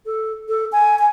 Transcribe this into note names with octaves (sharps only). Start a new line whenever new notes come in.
A4
A4
G#5
G#5